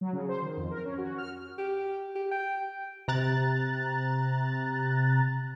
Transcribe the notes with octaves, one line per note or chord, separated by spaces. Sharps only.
F#3
C#3
C5
D#3
F2
A#4
C#4
F#4
F6
G4
G4
G5
C3 A#5 F#6 A6